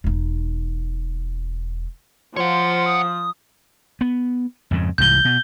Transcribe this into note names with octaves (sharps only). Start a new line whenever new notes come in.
E1 D#4
F3 C#5 F#5 C6
D#6
B3
F2 G#2 C#3
C2 G#2 E3 G6 G7
B2